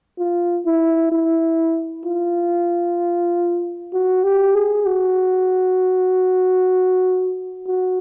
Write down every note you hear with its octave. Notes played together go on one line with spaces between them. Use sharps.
F4
E4
E4
F4
F#4
G4
G#4
F#4
F#4